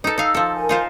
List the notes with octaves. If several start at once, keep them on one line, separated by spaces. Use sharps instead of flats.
D#4 A4 B4
D#4 F5 E6
F3 A4
A#4 G#5
D#4 F4 C5